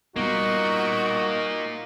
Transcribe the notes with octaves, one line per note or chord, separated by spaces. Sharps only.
G3 A#3 B3 D#4 F4 F#4